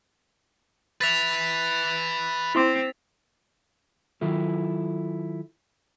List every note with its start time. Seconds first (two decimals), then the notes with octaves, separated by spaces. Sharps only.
1.01 B4 E5 A6 B6 F7
2.55 C4 E4 C6 D6
4.21 D#3 F#3 E4 F4 A4